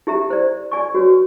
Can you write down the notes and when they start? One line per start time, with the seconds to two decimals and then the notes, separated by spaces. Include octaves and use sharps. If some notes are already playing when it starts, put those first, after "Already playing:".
0.07 E4 G4 E5 A#5
0.30 C5 D5
0.72 D5 G#5 C#6
0.94 F#4 B4 C#5